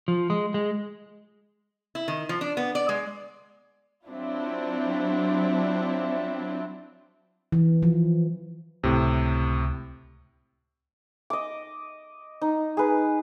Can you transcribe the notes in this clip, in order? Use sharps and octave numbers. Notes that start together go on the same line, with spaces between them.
F3
G#3
G#3
E4
D#3
F3
D4
B3
D5
G#3
F#3 C4 D4 E4 F4
E3
F3
C#2 A2 C3
D#5 D6
D#4
G#4 B4